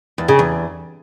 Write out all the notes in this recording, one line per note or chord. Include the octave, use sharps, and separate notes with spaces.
E2
C#3
E2